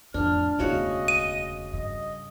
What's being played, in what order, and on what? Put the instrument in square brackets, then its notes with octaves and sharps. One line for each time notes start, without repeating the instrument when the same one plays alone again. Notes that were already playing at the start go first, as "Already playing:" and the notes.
[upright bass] F2 A2 [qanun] D4 [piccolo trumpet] F6
[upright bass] E1 D2 [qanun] C#3 F#4 C#5 [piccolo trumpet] D#5
[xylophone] D#7
[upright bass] G2 [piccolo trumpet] D#5